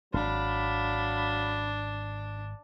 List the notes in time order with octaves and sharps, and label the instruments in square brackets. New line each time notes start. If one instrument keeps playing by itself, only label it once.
[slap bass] D#1 G#1 [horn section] F#3 F5 B5 [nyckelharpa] D4